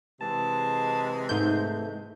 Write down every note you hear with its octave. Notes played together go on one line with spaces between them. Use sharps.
C3 E3 G#3 A5
G#2 A3 G6